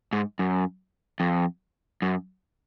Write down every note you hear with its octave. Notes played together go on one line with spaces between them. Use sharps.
G#2
F#2
F2
F#2